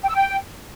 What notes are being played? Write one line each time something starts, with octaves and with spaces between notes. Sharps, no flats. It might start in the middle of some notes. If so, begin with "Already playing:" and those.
G5
E6
G5